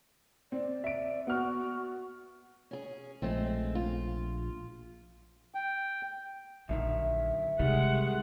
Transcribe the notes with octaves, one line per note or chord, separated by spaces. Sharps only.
C4 D5
E5 D7
B3 F#4 F6
C#4 G#4
A#1 G#3 A3 C4
F4
G5
A#1 F#2 D3 D#3 E5
C3 D#3 G3 G#3 F#5